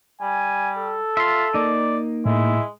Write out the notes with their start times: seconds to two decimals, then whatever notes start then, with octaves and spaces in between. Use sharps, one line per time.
0.21 G3 G#5
0.78 A4
1.17 F4 E5 C6
1.54 A#3 D#4 D5
2.26 A2 G#3 E4